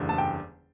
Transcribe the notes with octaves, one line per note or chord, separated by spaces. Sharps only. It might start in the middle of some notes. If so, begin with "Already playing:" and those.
Already playing: F#1 E2 D3 G3
A5
G5